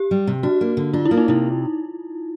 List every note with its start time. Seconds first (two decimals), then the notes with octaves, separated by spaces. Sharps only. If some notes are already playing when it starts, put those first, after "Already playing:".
Already playing: G4
0.11 G3
0.27 C3
0.43 D4 F#4
0.61 A#3
0.77 D3
0.93 D4 F4
1.05 E4
1.11 A#3
1.18 D#4
1.28 C3 E4